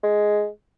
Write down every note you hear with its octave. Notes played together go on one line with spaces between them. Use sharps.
G#3